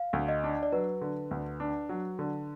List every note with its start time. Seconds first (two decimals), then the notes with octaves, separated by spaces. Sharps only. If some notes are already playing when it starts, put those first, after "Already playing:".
Already playing: F5
0.13 D2
0.29 D#5
0.44 D4
0.63 D5
0.72 F#3 B4
1.01 D3
1.31 D2
1.60 D4
1.89 F#3
2.19 D3